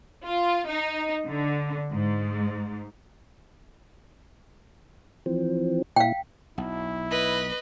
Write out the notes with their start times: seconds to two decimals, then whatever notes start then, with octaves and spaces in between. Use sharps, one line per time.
0.25 F4
0.67 D#4
1.26 D3
1.92 G#2
5.26 E3 F3 C4
5.96 A#2 E4 F5 G5
6.58 B1 E4
7.11 B4 D#5